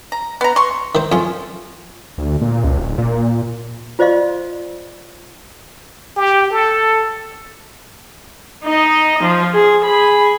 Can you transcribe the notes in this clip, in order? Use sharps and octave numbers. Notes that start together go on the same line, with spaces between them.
A#5
B3 A#5
C6 C#6
D#3 C5
F2 C#4 F4
D2
A#2
C#2
D1
A#2
F4 C5 D5 D#5 F5 C6
G4
A4
D#4 D#5
F3
G#4
G#4 B5